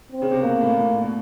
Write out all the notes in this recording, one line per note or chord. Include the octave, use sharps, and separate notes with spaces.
C4
C#3
C3
B2 A#3
A2
A#2
A2
A#2
B2